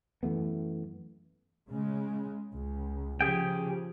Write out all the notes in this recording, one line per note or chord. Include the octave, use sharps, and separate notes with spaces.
F#2 E3 A3 B3
C#3 G#3
C#2
C#3 F3 G4 G#4 G5